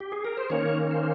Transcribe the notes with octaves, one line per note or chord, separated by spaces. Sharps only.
G4
G#4
A#4
C5
D#3 A#3 C#4 C#5
C5